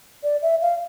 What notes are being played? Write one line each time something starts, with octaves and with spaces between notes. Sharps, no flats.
D5
E5
F5